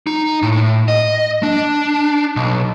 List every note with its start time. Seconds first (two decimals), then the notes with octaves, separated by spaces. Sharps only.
0.07 D#4
0.42 A2
0.88 D#5
1.43 D4
2.36 B1